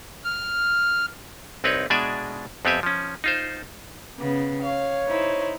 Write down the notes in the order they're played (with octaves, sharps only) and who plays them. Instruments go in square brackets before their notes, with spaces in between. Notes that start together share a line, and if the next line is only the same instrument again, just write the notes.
[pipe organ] F6
[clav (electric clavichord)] C2 C4 D#4 B4 C#5
B2 G#3 D4 D5 E5 G#5
F2 B3 C4 G4 E5 G#5
F3 C#4
D#4 F4 C5
[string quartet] C#3 B3
[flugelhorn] C#5 [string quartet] F5
[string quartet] D#4 E4 C5